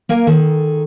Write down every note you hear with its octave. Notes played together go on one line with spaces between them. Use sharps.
A#3 A#4 F5 G#5
D#3 G#4 A4